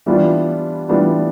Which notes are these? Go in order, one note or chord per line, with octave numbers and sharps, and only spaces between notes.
E3 G3 B3 D4 F4
E3 G3 B3 D4 F4